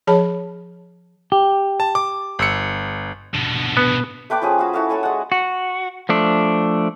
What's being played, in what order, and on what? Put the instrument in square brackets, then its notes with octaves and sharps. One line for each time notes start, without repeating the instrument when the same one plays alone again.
[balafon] F3 G#4 C#5 A5 B5
[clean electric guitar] G4
[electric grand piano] A5
D6
G1 E6 C#7
[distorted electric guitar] B2 D3
[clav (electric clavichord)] B3
[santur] A3 B4 G5 D6
F3 C#4 G#4
F#4 F5
E4 F#4 A4 F5
A4 C#5 G#5 B5
G#3 F#5
[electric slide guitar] F#4
F3 A3 D4